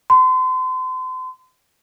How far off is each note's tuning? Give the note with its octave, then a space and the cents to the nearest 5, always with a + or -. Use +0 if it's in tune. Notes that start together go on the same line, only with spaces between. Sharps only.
C6 -35